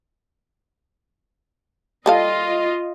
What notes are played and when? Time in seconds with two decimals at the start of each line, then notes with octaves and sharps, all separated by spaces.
2.06 G3 F4 A4 D#5 F5